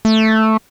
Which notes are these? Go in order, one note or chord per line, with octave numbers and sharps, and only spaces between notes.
A3